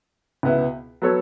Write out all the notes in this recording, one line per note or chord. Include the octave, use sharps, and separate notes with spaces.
C#2 B2 B3 E4
F#3 B3 A4 C#5